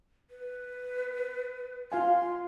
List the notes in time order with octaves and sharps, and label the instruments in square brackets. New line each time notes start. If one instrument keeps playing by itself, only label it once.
[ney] B4
[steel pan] F4 F5 G#5 [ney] C6